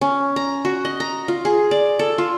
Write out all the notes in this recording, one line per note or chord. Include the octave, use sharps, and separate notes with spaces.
C#4
A#5
F#4
D#5
A#5
F4
G#4
D5
A4
F4